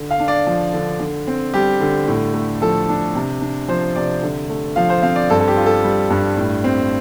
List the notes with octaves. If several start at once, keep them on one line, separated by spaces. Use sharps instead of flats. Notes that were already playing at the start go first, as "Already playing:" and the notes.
Already playing: D3
F5
D4
D5
F3
D3
D3
C4
G3 G4
D3
A2
A3
F3 A4
D4
C3
D4
F3 C5
C3 D5
D3
A3
F3 F5
C5
C4 F5
D5
G2 A4
A4
G4
F4
A4
G3
G2
A2
C4